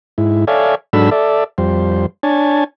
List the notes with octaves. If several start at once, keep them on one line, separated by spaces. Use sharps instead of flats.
G#2 E4
A4 C#5 D5 E5 F5 G#5
G#2 F#3 D4 A4 B5 E6
A4 D5 E5
F2 G3 C5
D4 C#5 G#5 A5